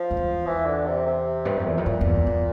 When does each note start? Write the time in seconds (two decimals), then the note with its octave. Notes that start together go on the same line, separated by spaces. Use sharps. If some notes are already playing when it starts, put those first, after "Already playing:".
Already playing: F3
0.11 F2
0.17 E2
0.47 E3
0.66 D3
0.86 C3
1.06 C3
1.45 G2
1.56 F2
1.66 E2 A#2
1.75 F2 C3
1.84 G2 A#2
2.01 F2
2.07 E2
2.27 E2